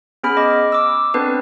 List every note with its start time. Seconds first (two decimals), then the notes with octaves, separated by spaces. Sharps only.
0.23 B3 C#4 G#4 G#5 B5 F6
0.37 D#5 B5 D6
0.72 D6 E6
1.14 B3 C4 D4 A4 B4